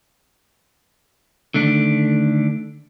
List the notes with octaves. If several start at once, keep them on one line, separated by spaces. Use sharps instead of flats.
D3 D#3 A3 D4